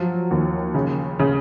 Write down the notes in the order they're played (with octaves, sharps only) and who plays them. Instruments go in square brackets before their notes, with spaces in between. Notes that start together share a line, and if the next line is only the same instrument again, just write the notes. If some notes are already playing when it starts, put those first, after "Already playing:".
Already playing: [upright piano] F3 F4 [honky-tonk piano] F#3
[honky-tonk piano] D#2
C#3
C#3